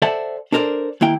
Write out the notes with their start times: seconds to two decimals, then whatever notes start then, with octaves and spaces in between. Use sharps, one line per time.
0.02 A4 C5 D5 E5 F#5 A5
0.52 D4 A4 A#4 C5 D5
1.01 D#2 A#3 E4 G5